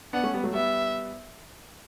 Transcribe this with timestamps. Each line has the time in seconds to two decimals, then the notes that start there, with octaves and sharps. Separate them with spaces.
0.13 B3 D4 F#5
0.24 A3 C#4
0.34 G3 B3
0.44 F#3 A3
0.53 G3 B3 E5